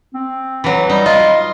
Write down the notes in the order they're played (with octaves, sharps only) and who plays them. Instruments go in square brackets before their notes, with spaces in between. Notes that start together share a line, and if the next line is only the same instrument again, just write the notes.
[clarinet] C4
[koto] E3 F#3
[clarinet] G3 [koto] D#4
[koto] F4 [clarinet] D#5